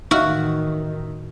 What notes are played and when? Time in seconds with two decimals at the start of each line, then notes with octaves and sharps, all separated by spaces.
0.11 A1 D#3 D#4 F#4 E5 F6